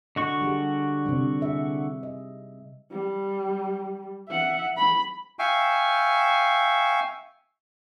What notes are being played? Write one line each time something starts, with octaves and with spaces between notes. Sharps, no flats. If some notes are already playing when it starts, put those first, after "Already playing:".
D3 F#4 D#5 C#6
G3 G4 G#4
C3 G3
G#4 E5
D#5
G3
E5 F#5
B5
E5 F5 G5 G#5 C#6